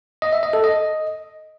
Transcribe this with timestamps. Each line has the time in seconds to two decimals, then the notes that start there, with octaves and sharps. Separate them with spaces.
0.22 D#5
0.33 E5
0.43 D#5
0.53 A4
0.64 D#5